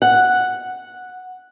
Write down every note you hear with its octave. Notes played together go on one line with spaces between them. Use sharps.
F#5